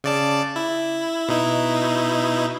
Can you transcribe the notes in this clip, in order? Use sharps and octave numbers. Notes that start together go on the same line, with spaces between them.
C#3 D5 A5
E4
B2 D#4 E4